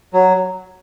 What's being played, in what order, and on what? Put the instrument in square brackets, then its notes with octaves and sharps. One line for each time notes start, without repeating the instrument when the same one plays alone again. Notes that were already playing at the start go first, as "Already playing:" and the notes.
[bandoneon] F#3